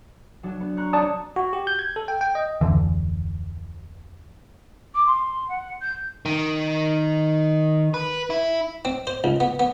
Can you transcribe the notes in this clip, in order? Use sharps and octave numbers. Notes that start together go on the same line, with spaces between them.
F#3 D4
B3
A#5 C#6 F#6
C4 D4 C#5 D5 A5 D#6
F#4
G4
G6
G#6
A4
G5
G5
D#5
D1 F2 D3 E3
D6
C6
F#5
G6
D#3
B4
E4
C4
C5
C#2
B3
B3